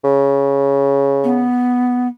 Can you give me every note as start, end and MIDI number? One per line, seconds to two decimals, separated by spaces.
0.04 1.47 49
1.24 2.07 59